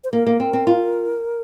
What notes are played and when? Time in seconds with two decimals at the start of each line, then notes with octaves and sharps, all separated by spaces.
0.04 C5
0.13 A#3 A#4
0.26 A#3
0.40 C4
0.53 C4
0.67 F4